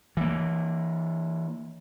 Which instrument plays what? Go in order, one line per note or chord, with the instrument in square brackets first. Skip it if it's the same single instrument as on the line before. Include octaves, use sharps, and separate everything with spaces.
[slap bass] E3 A#3